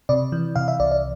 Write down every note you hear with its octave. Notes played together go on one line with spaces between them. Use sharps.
C3 D5
E3
C3 F5
E5
C2 D5
D5